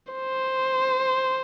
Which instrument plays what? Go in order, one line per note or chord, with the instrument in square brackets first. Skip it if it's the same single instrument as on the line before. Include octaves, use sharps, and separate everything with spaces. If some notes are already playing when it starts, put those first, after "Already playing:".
[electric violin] C5